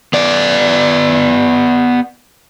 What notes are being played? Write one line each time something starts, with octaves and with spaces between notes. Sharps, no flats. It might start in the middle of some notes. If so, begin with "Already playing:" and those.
B3 D5